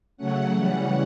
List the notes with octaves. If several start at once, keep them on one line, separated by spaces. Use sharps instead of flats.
C#3 F#3 A3 C#4 F#5
C#3 E3 G3 C#4